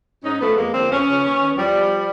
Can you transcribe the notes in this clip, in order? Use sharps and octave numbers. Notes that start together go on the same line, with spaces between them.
G#2 C#4 D#4
F3 A3 B3
F2 G#3 A#3
D3 F3 A#3 C4
F2 B3 C#4
C#3 F3
D#2
D#3
E2 F3 G3
B2